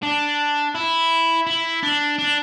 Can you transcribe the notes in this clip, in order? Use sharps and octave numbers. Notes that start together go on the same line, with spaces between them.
D4
E4
E4
D4
D4